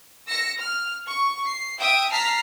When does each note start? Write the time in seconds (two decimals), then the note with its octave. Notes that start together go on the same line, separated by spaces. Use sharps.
0.28 E6 A#6 C#7
0.59 F6
1.07 C#6
1.45 C7
1.79 E5 G5 D#6 D7
2.10 A5 A#5 F6 B6 C7